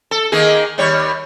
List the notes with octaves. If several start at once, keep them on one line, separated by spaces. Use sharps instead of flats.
A4
D#3 A#3 G#4
D#2 G3 C#5